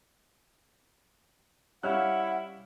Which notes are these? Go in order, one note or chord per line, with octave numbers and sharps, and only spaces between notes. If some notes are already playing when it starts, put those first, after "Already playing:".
G3 C#4 E4 C#5 F5 F#5 F6 F#6